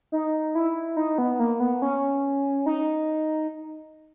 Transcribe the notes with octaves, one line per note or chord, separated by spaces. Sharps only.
D#4
E4
D#4
B3
A#3
B3
C#4
D#4